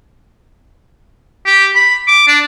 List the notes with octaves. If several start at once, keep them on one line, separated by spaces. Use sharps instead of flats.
G4
B5
D6
D4